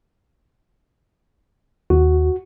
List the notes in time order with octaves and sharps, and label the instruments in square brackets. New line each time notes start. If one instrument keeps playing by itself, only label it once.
[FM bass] D#2 [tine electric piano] F#4